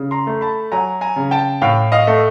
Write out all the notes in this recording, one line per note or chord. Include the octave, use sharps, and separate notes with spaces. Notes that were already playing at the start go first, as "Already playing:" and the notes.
Already playing: C#3
A#5 C6
A3
A5 B5
F#3 G#5 A#5
G#5 A#5
C#3
G5 A5
A2 F5 G5
D#5 F5
A3